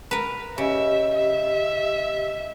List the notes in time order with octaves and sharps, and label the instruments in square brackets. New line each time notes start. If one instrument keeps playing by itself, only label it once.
[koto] A#4 B4
[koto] C#3 [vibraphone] G4 D#5 [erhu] E5
[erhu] E5